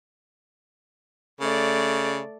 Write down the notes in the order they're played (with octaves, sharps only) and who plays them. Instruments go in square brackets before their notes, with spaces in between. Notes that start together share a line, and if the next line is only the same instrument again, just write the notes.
[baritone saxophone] C#3 [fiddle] A3 D5